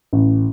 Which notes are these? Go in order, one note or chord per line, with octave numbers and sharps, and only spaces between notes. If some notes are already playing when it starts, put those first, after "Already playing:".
A1